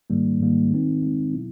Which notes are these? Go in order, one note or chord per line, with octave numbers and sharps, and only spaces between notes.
G#2 D#3 G3 A#3
G#2 D#3 G3 A#3
D#3 G#3 C4 D#4
D#3 G#3 C4 D#4
B2 F#3 B3 E4